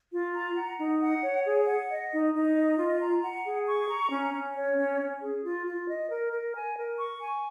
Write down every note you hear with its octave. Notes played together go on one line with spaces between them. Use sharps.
F4
A#5
F#5
D#4
F#5
C#5
G#4
F#5
D#5
D#4
D#4
D#5
F4
A#5
F#5
G#4
C#6
A#5
C#4
C#4
C#5
C#4
C#4
G#4
F4
F4
D#5
A#4
A#4
G#5
A#4
C#6
G#5